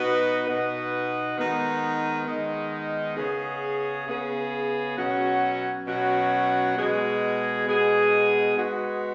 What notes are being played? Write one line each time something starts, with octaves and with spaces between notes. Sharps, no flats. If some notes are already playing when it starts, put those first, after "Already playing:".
Already playing: B2 B3 D#4 F#4 B4
B2 B3 D#4 F#4 B4
D#3 G#3 B3 D#4
D#3 G#3 B3 D#4
C#3 B3 G#4
C#3 B3 G#4
B2 F#3 C#4 F#4
B2 F#3 C#4 F#4
B2 G#3 B3 G#4
B2 G#3 B3 G#4
G#3 B3 D#4 F#4